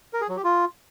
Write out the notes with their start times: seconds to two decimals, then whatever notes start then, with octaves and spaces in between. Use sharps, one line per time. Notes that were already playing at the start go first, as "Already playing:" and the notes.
0.13 A#4
0.21 G#4
0.29 F#3
0.37 G4
0.44 F4